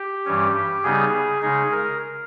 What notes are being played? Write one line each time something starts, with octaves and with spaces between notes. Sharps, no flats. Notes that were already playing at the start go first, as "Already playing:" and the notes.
Already playing: G4
G2 E3 G3 C#4
G4
C#3 G3 B3 D#4 G#4
C#3 G#3 D#4 G#4
A#4